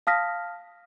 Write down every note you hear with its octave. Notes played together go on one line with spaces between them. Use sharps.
F5 A5 D#6 F6 A#6 B6